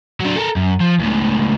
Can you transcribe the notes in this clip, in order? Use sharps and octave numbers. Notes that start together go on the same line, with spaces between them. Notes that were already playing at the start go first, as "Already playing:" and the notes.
F#3 D4
A4 A#4
F#2
F3
C#2 A2